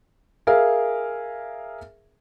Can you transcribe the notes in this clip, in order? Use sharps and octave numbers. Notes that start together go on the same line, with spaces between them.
G#4 A#4 E5 F5